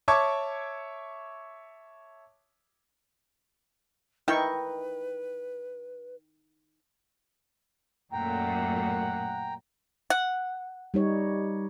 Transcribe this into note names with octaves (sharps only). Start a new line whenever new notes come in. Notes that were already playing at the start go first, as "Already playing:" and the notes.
C#5 E5 A5 C#6 D6 G#6
D#3 D#4 E4 B4 G5 C#6
F#2 A#2 A3 F#5 G5 A#5
F#5
G3 D#4 C#5